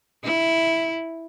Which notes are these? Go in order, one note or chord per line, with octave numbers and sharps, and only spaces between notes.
E4